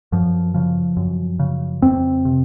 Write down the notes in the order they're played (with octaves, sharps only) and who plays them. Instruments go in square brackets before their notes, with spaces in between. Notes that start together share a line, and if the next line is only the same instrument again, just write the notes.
[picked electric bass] F#2 F3
C#3 F3
F#2
C#3
F2 C4
C3